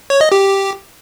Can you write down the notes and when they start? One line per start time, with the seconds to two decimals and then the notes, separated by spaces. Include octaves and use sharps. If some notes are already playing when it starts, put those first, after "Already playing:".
0.10 C#5
0.21 D#5
0.32 G4